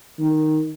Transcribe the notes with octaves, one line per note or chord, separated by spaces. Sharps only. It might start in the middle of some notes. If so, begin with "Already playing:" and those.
D#3